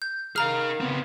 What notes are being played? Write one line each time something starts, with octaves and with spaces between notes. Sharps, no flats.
G6
D#3 G#4 F5 A#5 F6
C#3 B3 C4